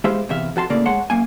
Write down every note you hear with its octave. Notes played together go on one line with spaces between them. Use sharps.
G#3 E4 G4 C5 E5 F5
E2 C3 E5 F5
F2 F#4 A5 C6
A2 C#3 A#3 D5
G#3 C#5 F#5 A5 C6
F#2 A#3 G#5